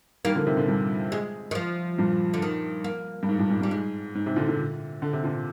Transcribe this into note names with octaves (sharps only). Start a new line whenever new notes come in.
D#3 G3 A#3
D3 F3
C3 D#3
A#2 D3
G2 A#2
G#3
D#3
F3
G2 A#2
D3
D#3
A#3
G2
G#2
G2 A#2
G#2
G2
G3
G#2 G#3
G#2
G#2 C3
A#2 D3
A#2 D3
D3
C3
A#2 D3